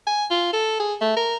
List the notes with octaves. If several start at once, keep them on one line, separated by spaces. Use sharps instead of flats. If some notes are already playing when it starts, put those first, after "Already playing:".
G#5
F4
A4
G#4
A3
A#4